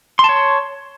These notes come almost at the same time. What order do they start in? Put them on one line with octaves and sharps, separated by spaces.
C6 A5 C#5